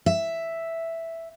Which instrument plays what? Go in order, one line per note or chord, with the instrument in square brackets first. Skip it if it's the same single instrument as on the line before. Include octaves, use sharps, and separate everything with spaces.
[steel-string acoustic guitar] E5